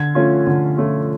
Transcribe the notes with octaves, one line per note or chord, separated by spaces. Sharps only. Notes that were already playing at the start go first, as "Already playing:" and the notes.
Already playing: D3 G#6
F3 A3 C#4 F4
D3
F3 A3 C#4 F4